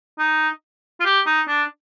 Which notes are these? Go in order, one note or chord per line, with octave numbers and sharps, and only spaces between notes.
D#4
F4
G4
D#4
D4